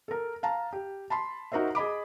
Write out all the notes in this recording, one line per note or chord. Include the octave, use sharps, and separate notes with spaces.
A4 A#4
F5 A5 A#5
G4
A5 B5 C6
D#4 F#4 A#4 C5 E5
G#4 D#5 B5 D6